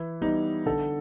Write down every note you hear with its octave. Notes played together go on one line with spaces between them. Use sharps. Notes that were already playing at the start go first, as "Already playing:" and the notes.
Already playing: E3 E4
G3 B3 D#4
D3 A4